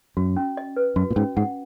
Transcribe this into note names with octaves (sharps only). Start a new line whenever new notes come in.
F#2 F#4
C#4
D#5
B4
F#2 F#4
A#2
G#2 C#4
G#2 F#5